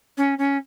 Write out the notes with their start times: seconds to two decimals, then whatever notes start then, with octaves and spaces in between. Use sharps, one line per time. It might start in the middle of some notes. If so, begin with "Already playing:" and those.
0.17 C#4
0.38 C#4